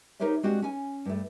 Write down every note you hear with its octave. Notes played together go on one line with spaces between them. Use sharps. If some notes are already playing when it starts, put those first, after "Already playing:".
D#4 G4 A#4 C5 C#5 E5
G#3 C4 D4 F#4 G4
C#4 G#5
G2 A3